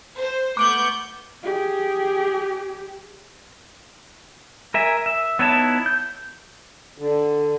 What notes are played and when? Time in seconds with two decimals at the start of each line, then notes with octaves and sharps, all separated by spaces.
0.16 C5
0.57 A3 B3 C#6 D6 G6 D7 F#7
1.43 G4 G#4
4.74 A#4 E5 G#5
5.06 E5
5.39 B3 D#4 E4 C#5 A5
5.86 G6
6.98 D3